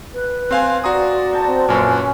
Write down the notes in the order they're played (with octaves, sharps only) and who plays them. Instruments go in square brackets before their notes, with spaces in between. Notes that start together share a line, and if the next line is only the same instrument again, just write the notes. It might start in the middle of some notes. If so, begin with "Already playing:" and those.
[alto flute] B4
[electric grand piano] C4 F5 G#5 [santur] C5
[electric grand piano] F#4 A#5 D#6 [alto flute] D5
[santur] G5 A5
[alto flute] C4
[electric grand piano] F#2 A#2 [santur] C#4 [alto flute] B4